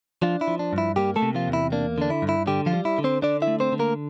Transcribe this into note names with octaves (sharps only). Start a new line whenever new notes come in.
F3 D4 F4
E4
F3
D4
G2
E4
G3 A#3 G4
A3 A4
C3
F3 F4
E2
E4
A#3 D4
D3 D4
E4
G2
E4
D3 G3 G4
F3 F4
G3
E4
D3
C4 C5
D3 D4 D5
E4 E5
A3
C4 C5
D3
A#3 A#4